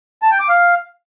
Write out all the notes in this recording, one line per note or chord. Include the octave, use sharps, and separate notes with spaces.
A5
G5
D6
F5